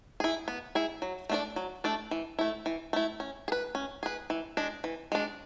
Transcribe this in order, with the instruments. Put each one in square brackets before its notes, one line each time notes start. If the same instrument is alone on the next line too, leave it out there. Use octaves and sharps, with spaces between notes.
[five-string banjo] E4 G#4
B3
E4 G#4
F#3
A3 D4 A4 D5
F#3
A3 D4 A4 D5
E3
A3 E4
E3
A3 E4
C#4
G#4
B4
C#4
G#4 B4
E3
G#3 D4
E3
G#3 D4